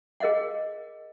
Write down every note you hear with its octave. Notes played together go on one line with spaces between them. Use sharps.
G#4 A#4 D#5 F5 F#5